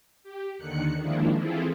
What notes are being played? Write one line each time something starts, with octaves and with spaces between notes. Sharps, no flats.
G4
D#2 D3 D#3 F#6 C#7
D#3 F3 G#3 A#3 D4 E4
E3 C4 E4 F4 G#4 A4